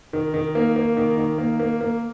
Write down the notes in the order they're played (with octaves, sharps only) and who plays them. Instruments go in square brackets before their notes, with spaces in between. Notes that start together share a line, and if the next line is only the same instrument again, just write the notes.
[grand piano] D#3
D#3
A#3
A#3
D#3
D#3
A#3
A#3
A#3